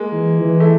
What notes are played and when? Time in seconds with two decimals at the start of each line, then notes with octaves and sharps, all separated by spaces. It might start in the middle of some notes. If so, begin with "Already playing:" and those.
Already playing: G#3 A#3
0.12 E3
0.41 E3
0.60 A3